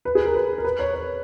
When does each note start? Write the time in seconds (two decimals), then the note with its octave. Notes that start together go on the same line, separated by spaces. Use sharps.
0.05 B4
0.15 G#4
0.25 A#4
0.35 B4
0.58 A#4
0.64 B4
0.79 C#5
0.94 C#5